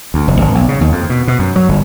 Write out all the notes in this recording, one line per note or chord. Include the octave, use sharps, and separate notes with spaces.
D2
F1
G#1
B1
C#3
D#2
F2
B2
B2
F#2
F#3
G1